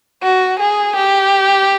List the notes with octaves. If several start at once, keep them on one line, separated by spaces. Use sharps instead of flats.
F#4
G#4
G4